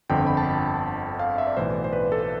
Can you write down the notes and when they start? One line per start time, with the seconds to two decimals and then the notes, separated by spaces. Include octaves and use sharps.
0.09 G1 F2 D3 G5
0.27 B5
0.37 A5
1.19 F5
1.38 E5
1.47 D5
1.57 B1 A2 E3 C5
1.74 D5
1.84 C5
1.93 B4
2.12 A4